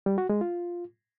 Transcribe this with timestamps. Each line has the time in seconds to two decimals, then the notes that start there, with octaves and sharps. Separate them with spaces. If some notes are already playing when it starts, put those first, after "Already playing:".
0.06 G3
0.18 F#4
0.29 G#3
0.41 F4